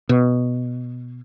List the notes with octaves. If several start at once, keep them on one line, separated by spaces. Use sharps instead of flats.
B2